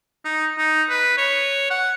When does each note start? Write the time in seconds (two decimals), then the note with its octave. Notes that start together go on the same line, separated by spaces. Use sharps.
0.25 D#4
0.58 D#4
0.89 B4
1.18 C#5
1.70 F#5